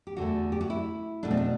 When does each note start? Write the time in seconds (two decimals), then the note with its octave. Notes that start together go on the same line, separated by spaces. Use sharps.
0.07 G4
0.16 E2 D3 A3 F#4
0.52 G4
0.61 F#4
0.70 E4
1.23 B2 A3 D4
1.31 C4
1.37 D4